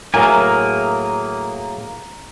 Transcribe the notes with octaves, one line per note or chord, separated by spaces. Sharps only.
A2 F#3 A#3 G#4 A#4 E5 G#5